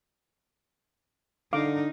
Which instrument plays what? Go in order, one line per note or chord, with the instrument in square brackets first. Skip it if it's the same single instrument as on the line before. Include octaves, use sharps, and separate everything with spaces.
[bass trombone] D3 [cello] D#4 [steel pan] F5 D6